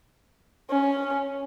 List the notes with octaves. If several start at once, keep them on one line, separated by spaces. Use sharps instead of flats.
C#4